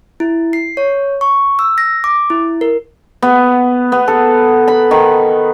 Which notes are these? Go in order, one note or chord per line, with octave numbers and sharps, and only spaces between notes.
E4
C7
C#5
C#6
E6
A#6
D6
E4
A#4
B3
B3
A4
B5
D#3